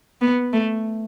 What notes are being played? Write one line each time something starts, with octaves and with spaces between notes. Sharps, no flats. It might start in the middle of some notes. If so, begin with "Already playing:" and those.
B3
A3